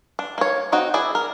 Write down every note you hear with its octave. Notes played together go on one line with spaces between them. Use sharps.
D4
A#3 C#5
C4 D#4 F#4
E4 G#4 D5
A#4